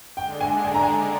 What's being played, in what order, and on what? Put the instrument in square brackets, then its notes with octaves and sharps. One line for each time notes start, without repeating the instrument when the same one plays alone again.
[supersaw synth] D3 G#3 D4 [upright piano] G5
[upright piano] G#5
G#5
A#5
G#5